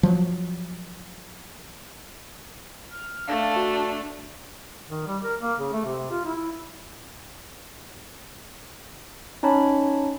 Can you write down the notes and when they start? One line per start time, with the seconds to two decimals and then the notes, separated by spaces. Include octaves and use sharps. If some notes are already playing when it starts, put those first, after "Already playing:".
0.03 F3 F#3
2.90 F6
3.28 A3 D4 F5
3.56 F#4
4.90 D#3
5.07 G3
5.24 A#4
5.41 A#3
5.59 C#3
5.73 A3
5.85 C3
6.11 F4
6.25 E4
9.43 C#4 D#4 C#5 A5 B5